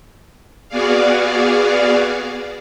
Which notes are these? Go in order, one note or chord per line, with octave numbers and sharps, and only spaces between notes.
B3 F#4 G#4 D5 F5